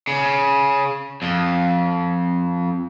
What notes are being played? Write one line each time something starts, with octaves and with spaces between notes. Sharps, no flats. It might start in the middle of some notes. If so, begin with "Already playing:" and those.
C#3
F2